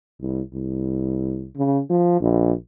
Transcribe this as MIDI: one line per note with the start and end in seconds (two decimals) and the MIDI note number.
0.21 0.41 36
0.54 1.48 36
1.56 1.80 49
1.90 2.18 53
2.21 2.52 34